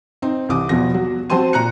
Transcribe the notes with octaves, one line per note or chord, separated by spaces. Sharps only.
C4 D#4
C2 E3 D6 D#6
E2 B2 F3 A#6
F#3
F#3 C4 C5 A5 C6 D#7
A#2 A#5 F#6 C#7